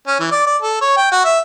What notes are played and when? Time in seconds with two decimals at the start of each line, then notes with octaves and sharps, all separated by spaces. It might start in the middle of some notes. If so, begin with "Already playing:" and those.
0.07 C#4
0.20 E3
0.32 D5
0.46 D5
0.62 A4
0.81 C#5
0.97 G5
1.12 F#4
1.25 E5